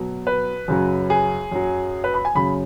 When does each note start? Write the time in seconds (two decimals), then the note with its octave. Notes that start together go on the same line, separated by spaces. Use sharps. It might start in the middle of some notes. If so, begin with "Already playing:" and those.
Already playing: B2 F#3
0.27 B4
0.68 F#2 C#3 F#3
1.10 G#4
1.52 F#2 F#3
2.04 B4
2.14 B5
2.25 G#5
2.35 F#2 C#3 F#3 B5